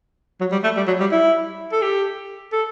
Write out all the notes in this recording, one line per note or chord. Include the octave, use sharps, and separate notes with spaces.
F#3
G3
A3
G3
F#3
G3
E4
A4
G4
A4